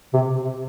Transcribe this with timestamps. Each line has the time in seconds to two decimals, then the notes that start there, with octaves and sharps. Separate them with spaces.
0.14 C3